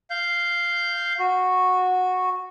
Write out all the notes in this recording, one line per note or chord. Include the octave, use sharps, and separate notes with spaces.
F5 G6
F#4